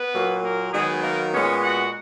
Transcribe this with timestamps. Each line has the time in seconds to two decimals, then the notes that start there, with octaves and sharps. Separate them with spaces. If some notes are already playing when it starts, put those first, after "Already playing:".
Already playing: B3 B4
0.13 A#2 F#3 A#3
0.43 A#3 A#4
0.73 D#3 F#3 G#3 B3 G#4
1.03 A#3 A#4
1.33 A#2 G#3 B3 C#4 C#5
1.64 F#4 F#5